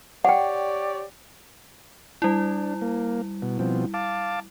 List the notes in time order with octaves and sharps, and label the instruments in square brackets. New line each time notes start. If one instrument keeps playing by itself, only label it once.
[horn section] G4 C#5 D5 [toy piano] F#5 G5
[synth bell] G3 E4 [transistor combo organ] D4
[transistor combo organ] A#3
B2
B2 F3 C4
F5 A5 D6